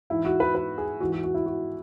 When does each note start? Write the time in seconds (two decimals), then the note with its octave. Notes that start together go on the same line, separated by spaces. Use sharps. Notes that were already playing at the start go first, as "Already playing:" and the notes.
0.10 G#2 E3 E4
0.25 F#4
0.40 B4
0.55 B4
0.78 G#4
1.00 G#2 E3 F#4
1.12 F#4
1.24 F#4
1.34 E4
1.46 F#4